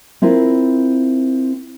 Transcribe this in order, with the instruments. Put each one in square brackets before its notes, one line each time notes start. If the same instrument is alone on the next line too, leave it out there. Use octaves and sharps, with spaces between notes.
[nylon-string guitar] C4 E4 F4 A#4